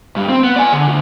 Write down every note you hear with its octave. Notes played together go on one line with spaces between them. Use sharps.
G2
C4
B3
D5 G#5
D3
D2